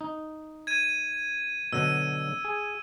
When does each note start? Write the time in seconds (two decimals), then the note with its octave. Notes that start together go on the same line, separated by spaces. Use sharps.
0.01 D#4
0.67 G#6 D#7
1.73 B2 D3 F#3 E6 D#7
2.45 G#4